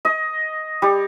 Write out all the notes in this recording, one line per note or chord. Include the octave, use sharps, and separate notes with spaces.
D#5
G3